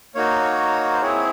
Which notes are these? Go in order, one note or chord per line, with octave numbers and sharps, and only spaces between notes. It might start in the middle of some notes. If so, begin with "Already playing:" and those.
A#3 D#4 F#4 C#5
C5
C4 E4 G#4 C#5